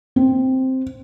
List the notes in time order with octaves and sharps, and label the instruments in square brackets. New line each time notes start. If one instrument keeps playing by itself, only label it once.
[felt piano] C4